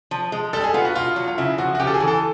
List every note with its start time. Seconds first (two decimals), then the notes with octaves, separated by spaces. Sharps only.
0.11 F3
0.32 G#3
0.53 G3 A4
0.64 G#4
0.74 B3 F4
0.85 F#4
0.95 B2 F4
1.16 F#3
1.28 F4
1.38 C#3 E4
1.58 F3 F#4
1.75 F#4
1.79 C#3 G4
1.87 A4
1.94 G#4
2.00 E3
2.08 A4